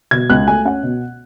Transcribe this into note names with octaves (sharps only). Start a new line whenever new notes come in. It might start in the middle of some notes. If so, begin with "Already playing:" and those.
B2 G#6
C#2 F#6
A3 G#5
C#4 F#5
B2